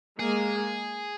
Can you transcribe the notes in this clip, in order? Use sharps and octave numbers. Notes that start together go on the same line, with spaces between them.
G#3 A#3 G#4